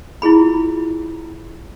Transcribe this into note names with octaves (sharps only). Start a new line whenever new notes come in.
E4 F4 G#4 B5